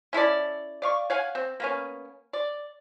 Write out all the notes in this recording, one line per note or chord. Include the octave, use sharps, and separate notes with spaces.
C#4 E4 A4 D5
D5 F5 C#6
C#5 F5 F#5 G#5
C4
A#3 B3 C#4
D5